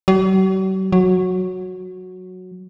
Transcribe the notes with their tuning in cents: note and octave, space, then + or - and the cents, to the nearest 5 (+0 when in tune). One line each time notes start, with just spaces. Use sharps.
F#3 +45
F#3 -10